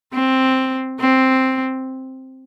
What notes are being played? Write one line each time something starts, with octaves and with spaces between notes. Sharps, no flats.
C4
C4